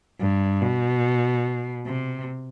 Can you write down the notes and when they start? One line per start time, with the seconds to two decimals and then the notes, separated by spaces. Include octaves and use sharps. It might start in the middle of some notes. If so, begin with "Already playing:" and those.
0.20 G2
0.61 B2
1.85 C3